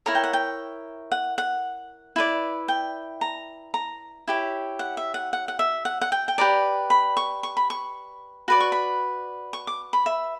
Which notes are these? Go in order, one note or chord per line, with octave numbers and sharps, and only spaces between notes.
E4 A#4 C#5 A#5
G5
F#5
G5
F#5
F#5
E4 B4 D5
G5
A#5
A#5
E4 G4 C#5
F#5
E5
F#5
F#5
F#5
E5
F#5
F#5
G5
G5
G4 B4 D5 A#5
B5
C#6
C#6
B5
C#6
F#4 B4 D5 B5
C#6
B5
C#6
D6
B5
E5